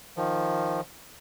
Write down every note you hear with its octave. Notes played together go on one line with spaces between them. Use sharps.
D#3 F3